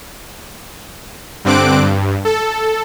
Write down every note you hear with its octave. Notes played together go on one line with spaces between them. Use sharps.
G2 D3 C4 D6 F#6 D7
G2
A4